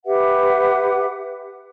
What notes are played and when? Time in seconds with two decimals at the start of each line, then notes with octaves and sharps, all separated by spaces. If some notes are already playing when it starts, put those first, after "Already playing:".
0.06 G4 B4 E5 F#5